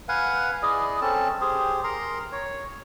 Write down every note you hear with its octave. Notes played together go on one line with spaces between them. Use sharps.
B4 F5 F#5 G#5
E4 G#4 D5 D#5
C4 C#4 A4 A5
G4 G#4 C5
A#4 A#5 C6
C#5